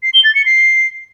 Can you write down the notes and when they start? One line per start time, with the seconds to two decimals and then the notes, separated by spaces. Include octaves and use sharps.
0.03 C7
0.14 G7
0.24 A6
0.35 C#7
0.46 C7